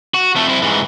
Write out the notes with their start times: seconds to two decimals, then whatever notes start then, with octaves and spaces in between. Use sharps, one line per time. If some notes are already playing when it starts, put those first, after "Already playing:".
0.14 F#4
0.36 F2 A3
0.49 C4 E4
0.62 G#2 E3